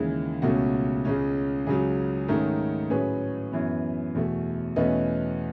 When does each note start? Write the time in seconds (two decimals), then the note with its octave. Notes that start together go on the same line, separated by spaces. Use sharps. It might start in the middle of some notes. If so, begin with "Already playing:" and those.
Already playing: D#2 C#3 E3 G#3
0.42 C#2 B2 A3 C#4 F#4
1.05 C#2 C#3 G#3 C#4
1.66 C#2 C#3 F#3 G#4
2.28 G#2 D#3 A3 C#4
2.90 A2 F#3 C#4 G#4 B4
3.52 F#2 E3 B3
4.15 E2 B2 A3
4.76 E2 B2 A3 C#4 B4 D#5